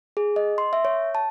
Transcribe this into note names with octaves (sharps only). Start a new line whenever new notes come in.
G#4
D#5
C6
E5
C#5
A5